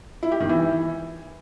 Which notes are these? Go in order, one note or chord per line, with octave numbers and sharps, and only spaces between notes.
E4
G4
D#3
E3